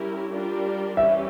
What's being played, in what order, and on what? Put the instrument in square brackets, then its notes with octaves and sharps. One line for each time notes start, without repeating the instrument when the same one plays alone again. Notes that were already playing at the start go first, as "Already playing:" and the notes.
Already playing: [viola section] G3 C#4 E4 G4 A#4
G3 D4 F4 A#4 D5
[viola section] E3 G3 C#4 G4 [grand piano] E5